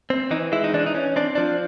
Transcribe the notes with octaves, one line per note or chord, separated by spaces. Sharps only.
C4
E3 D#4
G#3 E4
D#4
E3 D4
D#4
C#4
C4 D4
F3 D4